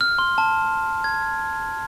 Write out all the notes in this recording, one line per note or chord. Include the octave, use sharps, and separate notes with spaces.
F6
C6
A5
G#6